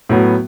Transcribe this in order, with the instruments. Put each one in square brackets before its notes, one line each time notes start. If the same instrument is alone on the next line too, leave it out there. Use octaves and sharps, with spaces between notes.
[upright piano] A2 F#3 B3